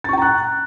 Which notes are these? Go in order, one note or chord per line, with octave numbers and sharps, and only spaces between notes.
G5 A#5 C#6 F#6 A6